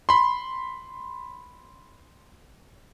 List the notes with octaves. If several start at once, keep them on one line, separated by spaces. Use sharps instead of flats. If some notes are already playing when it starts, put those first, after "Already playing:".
B5 C6